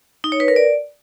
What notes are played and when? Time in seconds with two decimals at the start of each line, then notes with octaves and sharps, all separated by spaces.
0.24 D#4
0.32 C#5
0.40 B4
0.48 A#4
0.56 D5